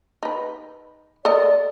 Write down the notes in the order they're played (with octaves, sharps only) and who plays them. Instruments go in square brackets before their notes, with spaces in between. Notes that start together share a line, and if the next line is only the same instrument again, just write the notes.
[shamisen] D#4 B4
[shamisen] A4 A#4 D#5 [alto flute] D5